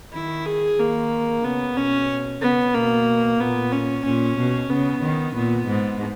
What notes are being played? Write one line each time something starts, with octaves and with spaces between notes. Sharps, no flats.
D#3 E4
G#4
D#3 A#3
C#3 B3
B2 C#4
C#3 B3
B2 A#3
A#2 B3
C#4
A#2 C#4
B2
C#3 B3
D#3
A#2 B3
G#2